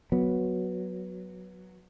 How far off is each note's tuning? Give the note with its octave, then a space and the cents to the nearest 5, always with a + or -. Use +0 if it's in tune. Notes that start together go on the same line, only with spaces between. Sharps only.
F#3 -5 B3 -10